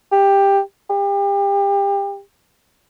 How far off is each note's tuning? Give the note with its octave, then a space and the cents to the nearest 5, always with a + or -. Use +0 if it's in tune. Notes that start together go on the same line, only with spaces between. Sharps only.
G4 +10
G4 +30